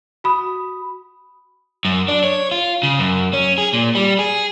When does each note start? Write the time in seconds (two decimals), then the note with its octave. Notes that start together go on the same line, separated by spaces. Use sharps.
0.24 F#4 B5 D#6
1.85 F#2
2.08 D4
2.24 C#5
2.51 F4
2.83 C#3
2.99 F#2
3.33 C#4
3.58 G#4
3.73 A#2
3.95 G3
4.19 G#4